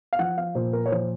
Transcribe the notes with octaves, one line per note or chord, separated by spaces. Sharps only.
F5
F3 F#5
F5
A#2 C5
A#4
C#5
F3 C5